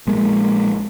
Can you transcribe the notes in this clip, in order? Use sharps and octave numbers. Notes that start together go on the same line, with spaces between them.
A#1 G#3 A#3